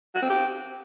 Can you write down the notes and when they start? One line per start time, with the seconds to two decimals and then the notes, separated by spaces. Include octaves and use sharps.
0.15 F#4
0.22 C4
0.30 G4